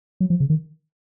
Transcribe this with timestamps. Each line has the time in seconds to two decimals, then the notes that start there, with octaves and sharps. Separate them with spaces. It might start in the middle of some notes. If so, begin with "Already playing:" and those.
0.20 F#3
0.30 F3
0.40 C#3
0.50 D#3